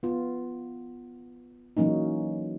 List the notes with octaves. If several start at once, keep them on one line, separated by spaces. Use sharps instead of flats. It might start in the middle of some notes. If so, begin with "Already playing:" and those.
B3 F4
E3 F#3 A#3 C#4 D#4